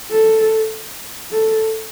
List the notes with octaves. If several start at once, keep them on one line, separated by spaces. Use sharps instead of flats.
A4
A4